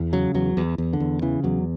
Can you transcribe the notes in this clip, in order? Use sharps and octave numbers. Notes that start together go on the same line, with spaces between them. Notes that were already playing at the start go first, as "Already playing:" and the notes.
Already playing: E2
C#3 F#3
E2 F#3
E2
E2
D3
E2
C#3 E3
E2 F#3